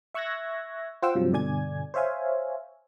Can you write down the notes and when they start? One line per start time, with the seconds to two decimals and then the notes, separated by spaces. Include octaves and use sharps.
0.14 E5 C#6 E6 F#6 G#6 A#6
1.02 F4 C5 F#5 G5 E6
1.15 G2 C3 F3 F#3
1.32 G2 B2 D3 D5 G#5 G#6
1.94 C5 C#5 E5 F5 G#5